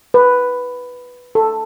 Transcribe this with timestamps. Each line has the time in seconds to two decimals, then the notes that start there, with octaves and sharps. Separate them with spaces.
0.14 B4
1.35 A4